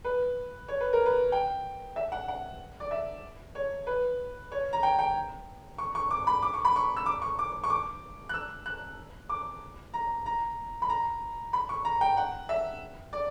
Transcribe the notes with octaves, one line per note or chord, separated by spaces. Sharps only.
B4
C#5
B4
A#4
B4
G5
E5
F#5
F#5
D5
E5
C#5
B4
C#5
A#5
G5
G5
C#6
C#6
D6
B5
D6
C#6
B5
C#6
E6
D6
C#6
D6
C#6
D6
F#6
E6
F#6
D6
A#5
A#5
B5
A#5
B5
C#6
A#5
G5
F#5
E5
D5